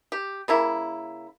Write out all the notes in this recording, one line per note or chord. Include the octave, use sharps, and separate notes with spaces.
G4
C#3 A#3 E4